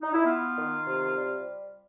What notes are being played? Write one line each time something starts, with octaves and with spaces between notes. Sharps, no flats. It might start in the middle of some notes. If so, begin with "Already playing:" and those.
D#4
E4
B3 F4
D#3
C3
G3